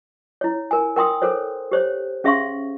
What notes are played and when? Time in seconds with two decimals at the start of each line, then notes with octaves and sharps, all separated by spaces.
0.41 E4 C#5
0.71 A#4 G#5
0.96 A#4 G5 C6 D#6
1.22 A4 A#4 C5 C#5
1.72 G4 C5 C#5
2.24 C#4 G#4 E5 F5 C6 C#6